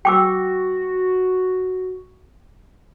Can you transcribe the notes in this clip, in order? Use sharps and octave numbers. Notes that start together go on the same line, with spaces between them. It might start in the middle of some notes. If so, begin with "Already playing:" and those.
F#4 G5 D6 E6